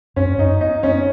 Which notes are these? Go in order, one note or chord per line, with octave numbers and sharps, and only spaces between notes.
F#2 C#4
F#2 D#4
B3 D#4
B3 C#4